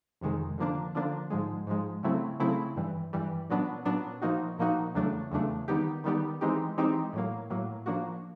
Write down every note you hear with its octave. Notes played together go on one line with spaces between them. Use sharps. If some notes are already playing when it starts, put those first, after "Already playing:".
F2 C3 D#3 G#3
D3 F3 A#3 D4
D3 F3 A#3 D4
G#2 F3 G#3
G#2 F3 G#3
C#3 F#3 A3 C4 E4
C#3 F#3 A3 C4 E4
G2 E3 G3
G2 E3 G3
A#2 F#3 B3 D4
A#2 F#3 B3 D4
A#2 F3 A#3 D#4 F#4
A#2 F3 A#3 D#4 F#4
E2 C#3 F#3 A3 D4
E2 C#3 F#3 A3 D4
D#3 G3 B3 D#4 G4
D#3 G3 B3 D#4 G4
E3 G#3 C4 D#4 G4
E3 G#3 C4 D#4 G4
A2 F#3 A#3
A2 F#3 A#3
F3 A#3 D4 F#4